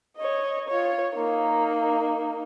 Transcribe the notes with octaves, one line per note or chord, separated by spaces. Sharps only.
C#5 D#5
F4 C#5
A#3 D#4